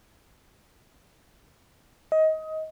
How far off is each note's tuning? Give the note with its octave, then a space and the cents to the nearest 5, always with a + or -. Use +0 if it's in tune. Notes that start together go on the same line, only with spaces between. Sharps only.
D#5 +20